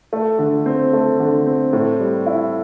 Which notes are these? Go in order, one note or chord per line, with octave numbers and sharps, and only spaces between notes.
A3
D3
C4
A3
D3
C4
A2
G3
E4